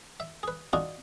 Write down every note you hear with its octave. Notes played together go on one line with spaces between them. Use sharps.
E5
G#4 B4
D4 D#4 F4 F#4 G#4